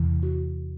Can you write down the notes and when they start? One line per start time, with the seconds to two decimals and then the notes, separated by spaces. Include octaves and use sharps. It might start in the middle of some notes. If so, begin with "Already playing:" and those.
Already playing: E2 C3 E3
0.23 F#4